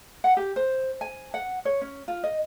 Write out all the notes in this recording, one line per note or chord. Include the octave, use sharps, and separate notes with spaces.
F#5
G4
C5
G#5
F#5
C#5
C#4
F4
D#5